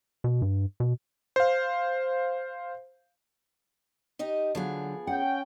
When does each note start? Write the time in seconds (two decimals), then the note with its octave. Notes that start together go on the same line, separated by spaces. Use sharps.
0.24 B2
0.42 G2
0.80 B2
1.36 C5 F5
4.19 D#4 G4 D#5
4.55 D3 F3 F#3 B3 G#4
5.07 C#4 F#5 G5